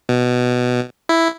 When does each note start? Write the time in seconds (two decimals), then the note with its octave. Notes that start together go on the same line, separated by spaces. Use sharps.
0.09 B2
1.09 E4